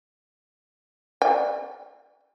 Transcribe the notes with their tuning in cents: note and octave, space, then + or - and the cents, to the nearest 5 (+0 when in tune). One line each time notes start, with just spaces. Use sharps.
D5 +35 G5 +45